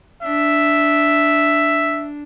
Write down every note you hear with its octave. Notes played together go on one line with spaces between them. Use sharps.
D4 E5